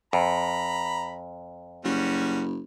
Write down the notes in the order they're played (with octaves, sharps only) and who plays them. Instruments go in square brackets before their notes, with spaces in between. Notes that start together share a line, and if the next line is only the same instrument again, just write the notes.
[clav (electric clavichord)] F2 [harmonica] A#5 B5
[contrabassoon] F#1 [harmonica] G3 C#4 F#4